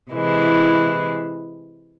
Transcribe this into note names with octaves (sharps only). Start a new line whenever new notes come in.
C3 E3 G#3 E4